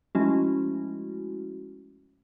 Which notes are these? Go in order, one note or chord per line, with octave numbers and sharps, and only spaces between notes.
F3 G#3 A3 C#4 E4 F#4